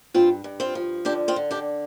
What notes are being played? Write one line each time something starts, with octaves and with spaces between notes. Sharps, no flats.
G2 C4 F4
G2
C4 F4
F3
D3 D4 G4
C4 F4
D3
D4 G4